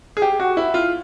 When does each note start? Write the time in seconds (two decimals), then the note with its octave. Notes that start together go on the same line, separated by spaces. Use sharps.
0.17 G#4
0.22 G4
0.40 F#4
0.57 E4
0.74 F4